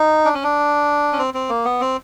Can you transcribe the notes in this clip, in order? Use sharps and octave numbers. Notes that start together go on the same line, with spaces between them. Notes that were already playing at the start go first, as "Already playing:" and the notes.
Already playing: D#4
D4
C#4
D4
C#4
C4
C4
A#3
B3
C4